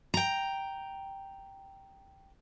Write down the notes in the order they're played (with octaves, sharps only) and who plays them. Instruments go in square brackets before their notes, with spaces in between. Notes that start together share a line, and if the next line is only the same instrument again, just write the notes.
[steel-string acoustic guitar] G5 A#5